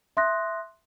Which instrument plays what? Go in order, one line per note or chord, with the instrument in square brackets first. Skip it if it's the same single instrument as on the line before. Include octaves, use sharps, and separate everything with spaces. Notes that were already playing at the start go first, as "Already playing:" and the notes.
[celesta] E5 C6 D#6 F#6 A#6